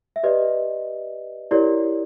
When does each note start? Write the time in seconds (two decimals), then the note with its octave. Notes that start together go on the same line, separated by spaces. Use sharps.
0.16 E5
0.23 G4 B4 D5 D#5
1.51 E4 G4 A#4 C#5 D5